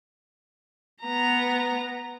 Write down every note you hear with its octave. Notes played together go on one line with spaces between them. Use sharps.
B3 A#5